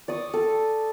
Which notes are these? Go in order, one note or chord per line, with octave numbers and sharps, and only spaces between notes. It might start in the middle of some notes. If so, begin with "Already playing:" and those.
D5 C#6 D#6
A4